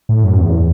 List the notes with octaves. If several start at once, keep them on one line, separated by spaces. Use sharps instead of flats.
A2
F#2
E2